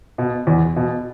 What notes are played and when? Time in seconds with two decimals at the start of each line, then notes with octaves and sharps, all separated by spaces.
0.18 B2
0.47 E2
0.76 B2